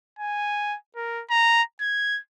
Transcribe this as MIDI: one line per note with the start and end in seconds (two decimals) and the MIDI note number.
0.19 0.76 80
0.96 1.23 70
1.30 1.62 82
1.81 2.19 92